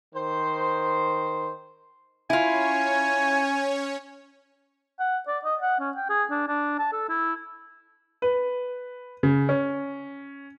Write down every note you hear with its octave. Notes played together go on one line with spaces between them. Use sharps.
D#3 C5
C#4 E4 F4 C#5 G#5
F#5
D5
D#5
F#5
C#4
G5
G#4
D4
D4
A5
A4
E4
B4
C#3
C#4